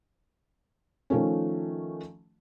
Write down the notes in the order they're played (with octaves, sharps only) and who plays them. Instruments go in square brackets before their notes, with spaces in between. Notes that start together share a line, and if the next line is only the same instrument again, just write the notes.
[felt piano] D#3 F3 A3 C#4